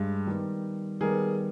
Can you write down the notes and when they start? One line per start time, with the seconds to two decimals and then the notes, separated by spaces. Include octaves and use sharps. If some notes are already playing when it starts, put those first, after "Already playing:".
Already playing: G2 G#3
0.27 D#3 G3 B3
1.01 D#3 G3 B3 G#4 A#4